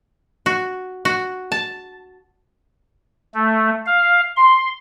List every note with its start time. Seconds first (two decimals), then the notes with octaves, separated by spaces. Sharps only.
0.46 F#4
1.05 F#4
1.52 A5
3.34 A3
3.86 F5
4.37 C6